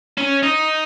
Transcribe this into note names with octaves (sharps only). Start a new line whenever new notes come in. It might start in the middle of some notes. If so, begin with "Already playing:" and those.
C#4
D#4